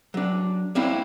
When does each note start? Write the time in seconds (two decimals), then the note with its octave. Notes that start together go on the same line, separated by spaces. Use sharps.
0.14 F#3 D4
0.75 A#3 C4 D4 E4